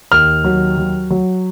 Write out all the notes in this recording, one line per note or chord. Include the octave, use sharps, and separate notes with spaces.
D#2 F6
F#3
F#3
F#3